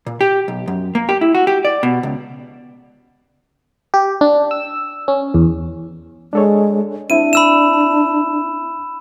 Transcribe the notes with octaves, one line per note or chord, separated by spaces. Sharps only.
A#2
G4
B1
F#2
A#3
G4
E4
F#4
G4
D5
B2
C#2
G4
D4
E6
C#4
E2
G#3 D4 A4 C#5
C4 D4 E4 E5 D#7
B5 E6 E7